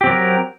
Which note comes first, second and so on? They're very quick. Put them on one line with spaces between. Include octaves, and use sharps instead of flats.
G4 C4 F#3 A#4